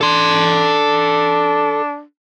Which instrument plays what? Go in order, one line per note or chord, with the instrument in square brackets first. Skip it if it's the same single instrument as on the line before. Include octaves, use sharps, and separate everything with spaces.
[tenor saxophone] D4 [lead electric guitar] A4 C6